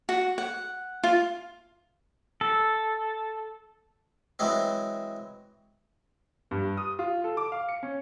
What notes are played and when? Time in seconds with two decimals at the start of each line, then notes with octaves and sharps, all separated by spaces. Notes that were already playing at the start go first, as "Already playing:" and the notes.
0.09 F#4
0.38 F#5
1.04 F4
2.41 A4
4.39 E3 F#3 G#3 C4
6.51 G2
6.77 D#6
6.99 F4
7.24 A4
7.37 D6
7.52 F5
7.69 C#7
7.83 C#4